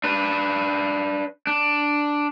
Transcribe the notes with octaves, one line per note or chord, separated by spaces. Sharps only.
D4 B4
D4